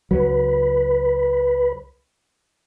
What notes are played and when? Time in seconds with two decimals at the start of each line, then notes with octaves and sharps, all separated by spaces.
0.11 C#2 F#3 B4